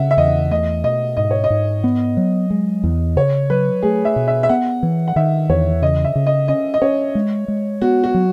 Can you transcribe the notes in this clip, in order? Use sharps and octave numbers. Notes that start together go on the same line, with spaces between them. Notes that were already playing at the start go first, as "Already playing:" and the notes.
Already playing: C#3 C#4 E5 F#5
E5
E2 D#5
A3 D#5
B2 D#5
G#2 D#5
C#5
D#5
G#2
B3
F#3
G#3
E2
C#3 C#5
F#3 B4
A3 G#4
E5
B2
E5
E5
B3 F#5
E3
F#5
D#3 E5
E2 C#5
C#3 D#5
E5
C#3
D#5
C#4 D#5
D#5
C#4 C#5
G#3
G#3
B3 F#4
F#4
F#3